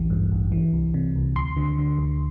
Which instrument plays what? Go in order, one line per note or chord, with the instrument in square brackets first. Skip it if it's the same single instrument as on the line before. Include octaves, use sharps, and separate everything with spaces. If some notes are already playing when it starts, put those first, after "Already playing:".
Already playing: [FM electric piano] A1 D2 E3
G2
A1
E3
C2
C3
C2
D2 C6
D3
D3
D2